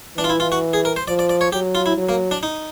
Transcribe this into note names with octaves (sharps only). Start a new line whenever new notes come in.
E3 D4
F4
E4
F4
F#4
G#4
A#4
C5
F3 D5
D5
D5
C#5
F#3 G4
F4
E4
F#3
A#3
D4
D#4